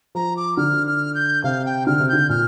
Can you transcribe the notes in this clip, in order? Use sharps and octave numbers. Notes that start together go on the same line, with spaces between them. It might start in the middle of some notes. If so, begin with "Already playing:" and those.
F3 A#5
D6
D3 F6
F6
G6
C3 F5
G5
D3 F6
C3
D3 G6
A#2 F6